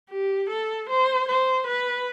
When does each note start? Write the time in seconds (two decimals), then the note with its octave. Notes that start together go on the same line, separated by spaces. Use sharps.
0.10 G4
0.49 A4
0.89 C5
1.28 C5
1.67 B4